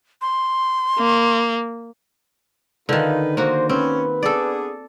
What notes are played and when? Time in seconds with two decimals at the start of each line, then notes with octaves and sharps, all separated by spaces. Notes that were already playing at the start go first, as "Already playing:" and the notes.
0.22 C6
0.99 A#3
2.89 D3 D#3 D#4 F4 B4
3.37 D#3 A#3 F#4 C5
3.69 C4 C#4 B4
4.23 B3 D4 G#4 A4 D5